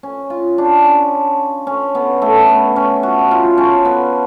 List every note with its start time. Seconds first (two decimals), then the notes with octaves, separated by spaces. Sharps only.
0.03 C#4
0.30 F4
0.58 D4
0.85 C#4
1.67 C#4
1.95 B3
2.22 A3
2.49 B3
2.76 C#4
3.03 F#4
3.31 F4
3.58 C#4
3.85 B3